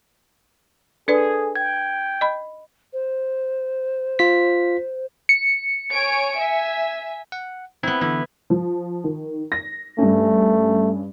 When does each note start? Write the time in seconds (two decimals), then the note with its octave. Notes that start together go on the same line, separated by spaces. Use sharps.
1.08 D4 G#4 A4 B4 D5
1.56 G5 G#6
2.21 D#5 B5
2.93 C5
4.19 F4 B6
5.29 C#7
5.93 C#5 G#5 D7
6.35 E5 G#5
7.32 F#5
7.83 B3 C4 E4
8.01 D3 E3 B3 E4
8.50 F3
9.04 D#3
9.52 A#6
9.98 G2 A3 C#4